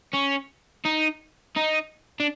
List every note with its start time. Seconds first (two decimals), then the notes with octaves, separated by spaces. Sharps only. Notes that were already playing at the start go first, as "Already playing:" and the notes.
0.14 C#4
0.85 D#4
1.56 D#4
2.20 D4